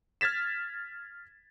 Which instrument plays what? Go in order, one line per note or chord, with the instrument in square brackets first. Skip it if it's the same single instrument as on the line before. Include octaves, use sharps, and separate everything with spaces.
[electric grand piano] F6 G#6 A6 B6 E7